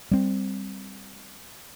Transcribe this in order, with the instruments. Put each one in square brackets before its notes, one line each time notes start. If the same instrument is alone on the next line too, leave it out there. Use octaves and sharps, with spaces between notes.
[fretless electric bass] G3 C4